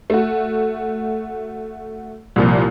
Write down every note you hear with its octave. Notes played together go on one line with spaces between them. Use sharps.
A3 F#4
C2 A#2 F3